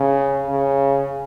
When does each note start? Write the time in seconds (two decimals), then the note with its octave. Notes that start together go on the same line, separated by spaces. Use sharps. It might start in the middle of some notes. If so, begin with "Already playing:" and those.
Already playing: C#3
0.46 C#3